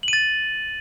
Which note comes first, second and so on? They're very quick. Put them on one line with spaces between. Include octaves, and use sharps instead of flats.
F#7 D#7 A6